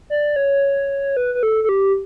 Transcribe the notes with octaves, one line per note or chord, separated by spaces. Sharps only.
D5
C#5
B4
B4
A4
A4
G4